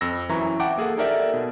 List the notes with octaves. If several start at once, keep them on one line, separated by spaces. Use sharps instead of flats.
F2 E6 A#6
F#2 E3 E4 A#5 C#6
E5 F#5 G5 A5 D6 D7
A#3 G#4 A4 F#5
D#4 G4 A4 A#4 D5 E5
B2